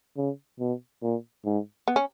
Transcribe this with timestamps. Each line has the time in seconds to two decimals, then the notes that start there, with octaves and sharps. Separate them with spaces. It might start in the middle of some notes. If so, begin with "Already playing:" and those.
0.17 C#3
0.60 B2
1.02 A#2
1.45 G#2
1.88 B3
1.96 C#4